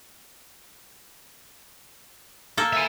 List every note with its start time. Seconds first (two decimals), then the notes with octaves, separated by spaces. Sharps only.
2.57 A#3 A4
2.73 E5 G#5